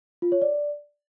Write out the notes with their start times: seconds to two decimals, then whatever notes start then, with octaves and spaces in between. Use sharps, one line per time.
0.22 F4
0.32 C#5
0.42 D5